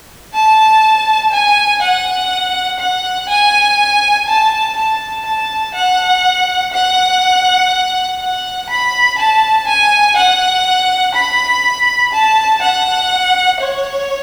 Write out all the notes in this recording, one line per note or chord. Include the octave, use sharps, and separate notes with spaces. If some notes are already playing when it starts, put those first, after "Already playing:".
A5
G#5
F#5
F#5
G#5
A5
A5
A5
F#5
F#5
F#5
B5
A5
G#5
F#5
B5
A5
F#5
C#5